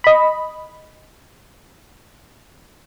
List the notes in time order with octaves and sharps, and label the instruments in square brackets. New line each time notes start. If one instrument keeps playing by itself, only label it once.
[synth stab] D#5 B5